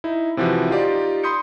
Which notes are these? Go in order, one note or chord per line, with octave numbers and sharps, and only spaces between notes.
D#4 E4
C3 E3 F3 F#4 B4
D#4 F4 G4 D5
B5 C6 D#6 G6 C#7